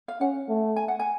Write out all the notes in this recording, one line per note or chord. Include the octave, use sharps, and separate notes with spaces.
F5
C#4 F#5
A3
G#5
F#5
G#5